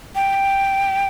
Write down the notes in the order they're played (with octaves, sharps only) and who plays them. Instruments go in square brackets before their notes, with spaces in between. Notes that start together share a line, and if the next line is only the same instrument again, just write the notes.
[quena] G5